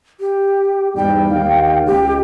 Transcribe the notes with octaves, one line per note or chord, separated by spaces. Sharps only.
G4
E2 G#2 G3 G5
D#2 F5
C#2 G4